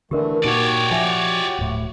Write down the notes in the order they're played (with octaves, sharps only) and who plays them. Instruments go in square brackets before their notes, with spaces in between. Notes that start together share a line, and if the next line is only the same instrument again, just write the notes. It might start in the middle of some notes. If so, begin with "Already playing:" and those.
[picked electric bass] D3 D4 [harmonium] E3 A3 [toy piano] G4 A#4
[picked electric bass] A#2 [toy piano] D#4 [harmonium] F#4 G4 [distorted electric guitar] C#5 D5
[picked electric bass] F3 [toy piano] E5 G#5
[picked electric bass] D1 A2